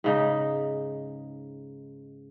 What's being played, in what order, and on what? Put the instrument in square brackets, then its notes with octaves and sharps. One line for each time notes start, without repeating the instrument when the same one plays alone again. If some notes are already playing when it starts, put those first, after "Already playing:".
[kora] G#2 C#3 D#4